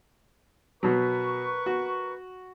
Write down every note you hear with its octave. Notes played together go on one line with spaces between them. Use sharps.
B2 F#3 A#4 B4 C#6
F#4